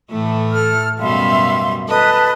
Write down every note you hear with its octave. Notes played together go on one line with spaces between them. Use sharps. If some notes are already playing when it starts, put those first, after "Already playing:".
A2 E3 A3
A4 F6
F#2 B2 G3 E5 F5 C6
A4 B4 D#5 A5